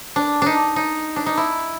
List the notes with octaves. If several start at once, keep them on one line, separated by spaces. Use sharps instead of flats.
D4
D4 D#4
D#4
D4
D#4
E4